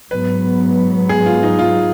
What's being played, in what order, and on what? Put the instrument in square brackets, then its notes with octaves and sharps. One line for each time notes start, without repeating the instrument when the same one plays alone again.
[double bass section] G#2 F#3 B3 [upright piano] B4
[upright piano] G#4
F4
D#4
F4